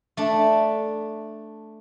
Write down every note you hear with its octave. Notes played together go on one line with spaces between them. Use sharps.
A3 D4